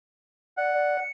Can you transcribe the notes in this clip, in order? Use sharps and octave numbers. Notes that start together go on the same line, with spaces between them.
D5 F#5
D5
C#7